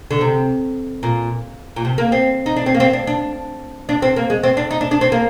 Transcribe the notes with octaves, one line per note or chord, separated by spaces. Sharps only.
D3
C3
A#2
A#2
C3
A#3
C4
D#4
D4
C4
A#3
C4
D4
D4
D4
C4
A#3
G#3
C4
D4
D#4
D4
D4
C4
A#3